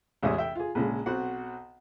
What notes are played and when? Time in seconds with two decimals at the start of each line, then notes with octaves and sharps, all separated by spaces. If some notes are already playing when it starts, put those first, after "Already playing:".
0.23 A1 E2 G#3 C#4 E5 D#6
0.38 E5 G5
0.55 F4 G#4
0.75 A#1 A#2 C#3 G#3
1.06 B1 C4 F#4 F#5